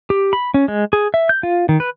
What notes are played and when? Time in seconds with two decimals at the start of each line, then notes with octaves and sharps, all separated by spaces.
0.10 G4
0.33 B5
0.54 C#4
0.68 G#3
0.93 G#4
1.14 E5
1.29 G6
1.43 F4
1.69 D#3
1.80 B4